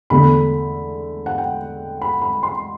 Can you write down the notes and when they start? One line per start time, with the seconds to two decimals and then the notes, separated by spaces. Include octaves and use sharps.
0.10 E2 D3 A3 B5
1.26 F#5
1.38 G5
2.02 B5
2.22 B5
2.43 C6